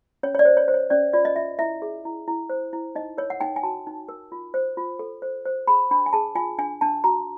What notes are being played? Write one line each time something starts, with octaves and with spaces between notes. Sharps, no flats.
C#4 C#5
C#5
D5
C5
C#5
C5
C#5
C#4 D5
F4 D5
D#5
F4 E5
E4 E5
G#4
E4
E4
C5
E4
D#4 D#5
A#4 C#5
F#5
D#4 G5
G#5
F#4 A5
D#4
A#4
F4
C5
F4
A4
C5
C5
G#4 B5
D4 B5
G#5
G#4 A5
F4 G#5
D4 G#5
D4 A5
F#4 A#5